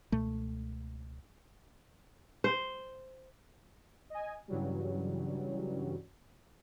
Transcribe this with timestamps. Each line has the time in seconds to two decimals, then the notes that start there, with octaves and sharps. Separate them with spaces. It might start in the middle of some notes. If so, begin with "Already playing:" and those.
0.12 C#2 B2 A3
2.44 C5
4.10 D#5 G#5
4.48 G2 C#3 E3 F#3 G3